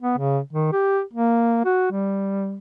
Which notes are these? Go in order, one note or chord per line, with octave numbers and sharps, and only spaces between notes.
B3
C#3
D#3
G4
A#3
F#4
G3